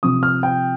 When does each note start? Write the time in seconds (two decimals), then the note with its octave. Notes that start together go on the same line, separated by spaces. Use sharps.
0.03 C3 F3 C4 D#6
0.23 F6
0.43 G5